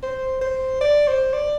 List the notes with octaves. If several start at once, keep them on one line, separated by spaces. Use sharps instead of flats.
C5
C5
D5
C5
D5